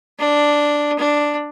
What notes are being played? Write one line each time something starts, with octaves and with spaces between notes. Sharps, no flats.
D4
D4